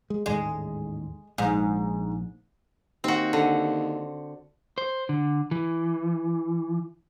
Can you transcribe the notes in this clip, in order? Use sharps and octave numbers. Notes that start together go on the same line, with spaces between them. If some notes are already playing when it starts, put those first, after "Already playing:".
G#3
A1 D#2 G#2 G#3
A#1 G#2
D#2 C4 F#4
D3
C5
D3
E3